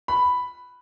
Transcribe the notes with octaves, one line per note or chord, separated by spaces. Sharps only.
B5